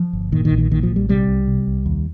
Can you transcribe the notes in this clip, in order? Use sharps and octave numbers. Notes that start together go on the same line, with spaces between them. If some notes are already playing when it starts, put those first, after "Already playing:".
Already playing: F3
G1
A#2 D#3
D#3
A#1
D#3
A#2 D#3
F3
A#1
G3
C3 G3
C2
C3
C2
D#2